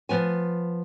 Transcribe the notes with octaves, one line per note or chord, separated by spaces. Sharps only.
F3 B3 G#5